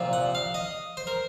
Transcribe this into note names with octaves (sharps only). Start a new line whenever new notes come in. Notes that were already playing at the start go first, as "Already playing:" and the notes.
Already playing: C2 A#2 F3 C4
F#5
F5
D#5
C5
A#4